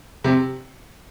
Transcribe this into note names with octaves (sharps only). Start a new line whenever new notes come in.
C3